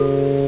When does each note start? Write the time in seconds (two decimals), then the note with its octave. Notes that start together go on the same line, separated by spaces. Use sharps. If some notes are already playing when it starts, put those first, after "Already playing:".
Already playing: C#3 F#4 A4